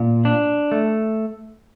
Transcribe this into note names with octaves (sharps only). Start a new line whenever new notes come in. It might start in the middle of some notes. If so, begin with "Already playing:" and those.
Already playing: A#2
D4
A3